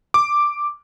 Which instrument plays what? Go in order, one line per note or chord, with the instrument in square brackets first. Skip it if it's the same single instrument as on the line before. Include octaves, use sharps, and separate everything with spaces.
[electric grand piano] D6